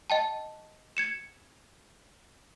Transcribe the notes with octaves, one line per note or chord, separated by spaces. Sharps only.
D#5 G5 A5
G#6 C#7 E7